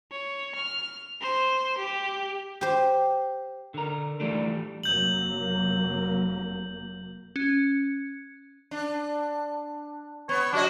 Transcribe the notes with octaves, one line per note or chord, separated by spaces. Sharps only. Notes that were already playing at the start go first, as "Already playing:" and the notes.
C#5
F6
C5
G4
G4 C5
D3 A#4
E3 G3 A3 D4
F1 F#3 A#3 G6 F#7
C#4
D4
B3 C#5
F#3 D4 F#4 D#5